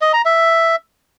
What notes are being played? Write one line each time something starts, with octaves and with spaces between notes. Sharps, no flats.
D#5
A#5
E5